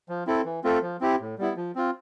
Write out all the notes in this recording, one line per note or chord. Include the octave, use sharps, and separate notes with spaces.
F3
C4 E4 A4
E3
A3 C4 F4 A4
F3
C4 E4 G4
A2
G3 B3 E4
F3
C4 F4